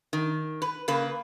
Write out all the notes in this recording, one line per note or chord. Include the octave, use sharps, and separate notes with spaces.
D#3
B4
C#3 A#3 B4